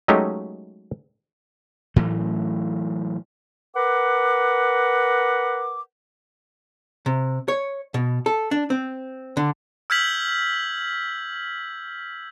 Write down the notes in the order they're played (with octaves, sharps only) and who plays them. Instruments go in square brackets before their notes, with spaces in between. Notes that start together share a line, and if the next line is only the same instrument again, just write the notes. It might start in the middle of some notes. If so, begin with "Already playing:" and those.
[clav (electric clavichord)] F#3 G#3 A3 C#4 D#4 G4
[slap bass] A2 E3 F#3 A3
[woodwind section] A#4 B4 F#5 D6
[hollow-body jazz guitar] C3
C#5
B2
A4
D4
C4
D3
[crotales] E6 F6 G6 G#6 B6 F#7